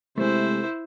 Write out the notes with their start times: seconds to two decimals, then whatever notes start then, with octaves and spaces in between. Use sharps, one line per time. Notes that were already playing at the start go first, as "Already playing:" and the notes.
0.18 C3 G#3 A3 E4 C5